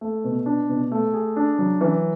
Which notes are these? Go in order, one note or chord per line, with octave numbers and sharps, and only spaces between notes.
A3
B2
D4
B2
A3
G#4
D4
F#3
E3